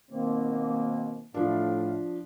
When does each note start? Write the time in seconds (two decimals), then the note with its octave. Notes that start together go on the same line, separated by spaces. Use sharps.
0.11 B2 D#3 A#3 C4
1.34 A2 F3 D4 D5 F5